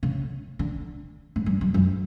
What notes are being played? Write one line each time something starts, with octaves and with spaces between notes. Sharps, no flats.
C#3
D3
A2
G2
F#2
F#2